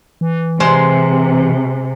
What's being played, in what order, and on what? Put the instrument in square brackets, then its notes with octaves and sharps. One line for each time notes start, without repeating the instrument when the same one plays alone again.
[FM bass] E3
[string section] C3 [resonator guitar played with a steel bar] G#3 C5